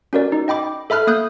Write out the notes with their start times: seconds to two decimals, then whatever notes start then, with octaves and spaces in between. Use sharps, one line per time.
0.13 C#4 F#4 A#4 D5
0.32 D#4
0.48 D#5 G5 B5 D6
0.90 A4 E5 B5 F6 F#6
1.07 A#3 D#6 F#6 G6